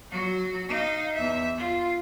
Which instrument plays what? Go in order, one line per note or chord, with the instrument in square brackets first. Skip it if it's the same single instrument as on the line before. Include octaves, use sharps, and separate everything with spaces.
[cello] F#3 F#4
D#4 F5
E2 E5
F4